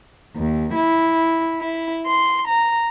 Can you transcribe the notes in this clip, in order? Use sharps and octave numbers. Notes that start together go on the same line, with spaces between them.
D#2
E4
E4
C6
A#5